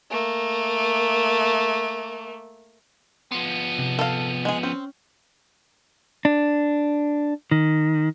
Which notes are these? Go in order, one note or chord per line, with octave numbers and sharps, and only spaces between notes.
A3 A#3
F3 B3 C6
C3
A4 F5
G#3 G#4
C4 C#4
D4
D#3